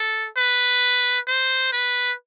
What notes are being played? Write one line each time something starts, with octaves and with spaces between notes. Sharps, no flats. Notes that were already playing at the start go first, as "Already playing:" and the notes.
Already playing: A4
B4
C5
B4